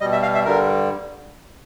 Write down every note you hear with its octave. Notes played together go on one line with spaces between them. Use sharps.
B2 G3 D#5
E5
F5
E5
G2 D3 G3 A#4